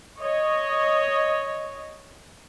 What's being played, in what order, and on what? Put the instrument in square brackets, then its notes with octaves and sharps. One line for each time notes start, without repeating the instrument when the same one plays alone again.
[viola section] C#5 D#5